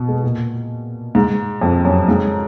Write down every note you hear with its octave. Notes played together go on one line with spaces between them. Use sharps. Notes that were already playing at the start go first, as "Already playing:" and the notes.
Already playing: B2
G#3
A#2
G#2
F2
F#2
G#2